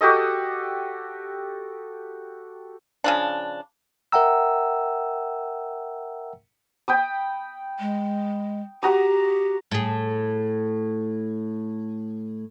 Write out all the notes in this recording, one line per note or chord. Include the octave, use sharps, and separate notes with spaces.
F#4 G4 A4 D#5
C#3 F3 D4
A#4 E5 F#5 G5 A#5 E6
G5 B5 D#6
G#3
F#4 G4 A#5 D#6
A2 G#4